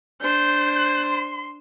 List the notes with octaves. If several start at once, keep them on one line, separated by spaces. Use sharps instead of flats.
D4 C5 G6
C6